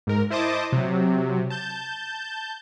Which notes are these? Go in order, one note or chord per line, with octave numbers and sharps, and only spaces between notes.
G#2 A#4
E4 C5 D#5 A5 D6 D#6
C3 F#3
A5 G6